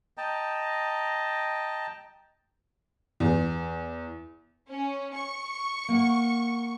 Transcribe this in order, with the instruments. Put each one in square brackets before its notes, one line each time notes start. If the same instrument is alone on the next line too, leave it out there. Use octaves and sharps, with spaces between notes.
[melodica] D#5 G5 A5 A#5
[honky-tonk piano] E2
[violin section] C#4
C#6
[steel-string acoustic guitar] A#3 F#5